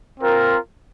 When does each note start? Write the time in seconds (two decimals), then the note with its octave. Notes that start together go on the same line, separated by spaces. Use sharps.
0.20 C4 F4 A#4